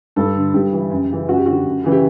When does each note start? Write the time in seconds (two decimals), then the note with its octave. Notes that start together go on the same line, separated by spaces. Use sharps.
0.16 G2 A4
0.35 D3
0.54 G2 G4
0.73 E3
0.90 F#2
1.09 C#3 E3
1.28 F#2 F#4
1.37 G4
1.46 D3 F#4
1.66 F#2
1.84 C#3 E3
1.92 G4